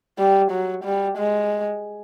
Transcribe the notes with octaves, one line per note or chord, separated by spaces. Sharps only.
G3
F#3
G3
G#3